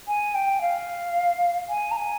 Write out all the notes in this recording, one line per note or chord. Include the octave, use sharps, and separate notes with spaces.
G#5
G5
F5
G#5
A#5
G#5